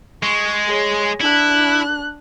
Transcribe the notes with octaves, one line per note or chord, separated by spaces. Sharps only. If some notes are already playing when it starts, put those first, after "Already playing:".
G#3 C#6
G#4 C#5
D4 E4 F#6